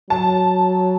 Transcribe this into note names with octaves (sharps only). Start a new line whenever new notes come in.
F#3 A5